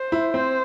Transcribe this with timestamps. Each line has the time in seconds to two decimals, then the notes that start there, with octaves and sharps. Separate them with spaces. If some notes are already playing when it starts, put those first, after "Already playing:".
Already playing: C5
0.12 E4
0.33 C4 C5